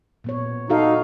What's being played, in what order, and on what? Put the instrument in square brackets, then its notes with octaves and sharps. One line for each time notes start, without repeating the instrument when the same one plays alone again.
[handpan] A#2 B3 C#5
[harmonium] D#4 [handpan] F#4 A4 F5